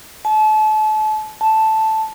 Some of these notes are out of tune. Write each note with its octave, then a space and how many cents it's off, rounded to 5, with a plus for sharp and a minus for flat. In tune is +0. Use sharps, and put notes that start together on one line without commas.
A5 -35
A5 +0